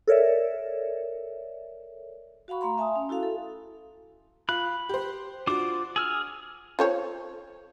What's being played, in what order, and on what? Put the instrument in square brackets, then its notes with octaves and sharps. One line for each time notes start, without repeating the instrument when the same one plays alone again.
[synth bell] A4 A#4 C#5 D5 E5
[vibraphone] F#4 F5 F#5 B5 C#6
A3 F5 A#5 C6
E5 G#5 A5 C6 D#6
C#4
E4 F#4 A4 F5
A4
[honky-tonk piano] F4 [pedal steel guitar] B5 F#6
[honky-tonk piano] G4 C5
[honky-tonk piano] D4 F#4 [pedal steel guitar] F4 C5 D6
[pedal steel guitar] G#4 E6 F6
[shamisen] F4 C5 C#5